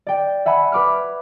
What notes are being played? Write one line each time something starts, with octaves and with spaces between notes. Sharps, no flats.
D5 G5
E5 F#5 G#5 B5
B4 D6 F6